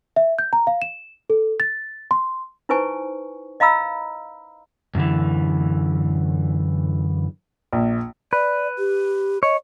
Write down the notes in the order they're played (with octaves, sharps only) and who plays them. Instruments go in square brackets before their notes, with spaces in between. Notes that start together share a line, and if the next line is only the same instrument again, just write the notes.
[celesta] E5
G6
A#5
F5
E7
A4
A6
C6
[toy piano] D#4 E4 B4 C5 G#5 C#6
D#5 F5 A#5 B5 E6
[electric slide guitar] F#2 D3 E3
[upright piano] A#1
[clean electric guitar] B4 [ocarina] D5
[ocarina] G4
[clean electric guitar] C#5 [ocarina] D#5